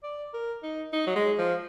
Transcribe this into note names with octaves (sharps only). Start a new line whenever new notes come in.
D5
A#4
D#4
D#4
F#3
G#3
F3